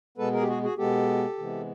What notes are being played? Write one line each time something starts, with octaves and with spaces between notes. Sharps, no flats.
B2 G#3 B3 A4 B4
G#4 A#4
G4
F#4 G#4
F#4 G#4
B2 G#3 B3 G4 A4
C3 E3 G#3 B3